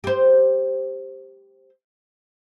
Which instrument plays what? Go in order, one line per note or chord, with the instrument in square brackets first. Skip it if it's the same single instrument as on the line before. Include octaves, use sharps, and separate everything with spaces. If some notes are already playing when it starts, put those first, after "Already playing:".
[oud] G4 C5